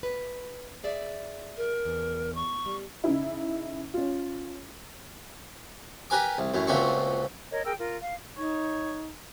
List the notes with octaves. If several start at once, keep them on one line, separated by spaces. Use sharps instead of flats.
B4
G#4 D5 E5
A#4
E2
C#6
G3
C#3 D#4 E4
C#4 F4
G4 A#4 B4 G#5 D6
C2
F#2 A2
C#2 A#2 A3 C4 F#4 C#6
A#4 C#5 D#5
G#4 A#4 G5 E6
F4 A#4
F5
D#4 C#5